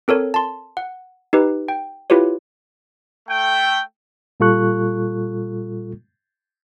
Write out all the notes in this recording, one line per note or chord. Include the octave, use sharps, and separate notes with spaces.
C4 A4 A#4 C#5
A5 C6
F#5
D#4 G4 B4
G5
E4 F4 G4 B4 C#5
A3 G5
A#2 G3 F4 A4 C#6 F#6